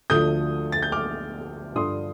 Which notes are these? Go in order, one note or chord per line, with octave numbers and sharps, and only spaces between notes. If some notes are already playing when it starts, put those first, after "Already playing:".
D2 D3 F3 D#6 G6
A6
G6
D6 F6
G2 D3 F3 C6 D#6